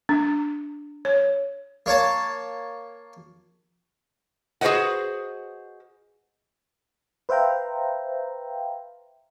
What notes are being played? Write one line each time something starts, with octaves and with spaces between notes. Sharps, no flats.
D4
C#5
A#3 C#5 A5
F#4 G#4 B4 C5 D#5 F#5
B4 C5 E5 F5 G5 A#5